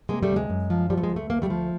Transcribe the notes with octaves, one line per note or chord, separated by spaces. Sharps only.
C3 G#3 A#3
G3 A3
D2
G#3
F#2
F3
F3 G3
A3
G#3
D2
A3
D2 A#3
G3 A3
F3